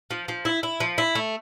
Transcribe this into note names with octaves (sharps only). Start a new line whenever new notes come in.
F3
F3
E4
E4
F3
E4
A3